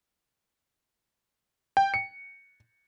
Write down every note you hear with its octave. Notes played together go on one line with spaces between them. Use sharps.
G5
C#7